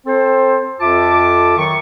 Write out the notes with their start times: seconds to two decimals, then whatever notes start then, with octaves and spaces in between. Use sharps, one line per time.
0.06 C4 A4 C5
0.80 F2 F4 A4 E5 A5 D6
1.58 D#3 F#3 C#6